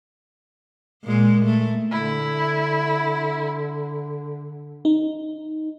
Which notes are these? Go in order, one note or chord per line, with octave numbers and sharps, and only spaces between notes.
A#2 G#3
A3
D3 E4
D#4